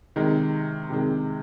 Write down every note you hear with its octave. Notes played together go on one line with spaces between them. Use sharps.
C3 D#3 G#3
C3 D#3 G#3